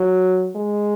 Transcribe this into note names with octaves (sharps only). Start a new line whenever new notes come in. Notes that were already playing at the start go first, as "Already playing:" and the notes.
Already playing: F#3
G#3